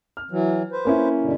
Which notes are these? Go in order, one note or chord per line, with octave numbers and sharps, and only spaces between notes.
F6
E3 F#3
B4 C5
A#3 C#4 E4
G2 B2 D3